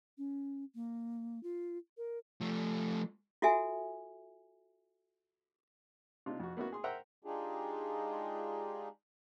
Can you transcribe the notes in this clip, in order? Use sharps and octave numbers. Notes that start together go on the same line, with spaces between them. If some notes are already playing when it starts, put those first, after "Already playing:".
C#4
A#3
F4
A#4
F3 A3
F4 F#4 A4 E5 G#5
C3 D4 D#4 F4
F2 F#4
A#3 B3 C#4 E4 F#4
G#4 C6
A#4 C5 E5 F#5 G5 A#5
G#3 D4 D#4 F4 G4 G#4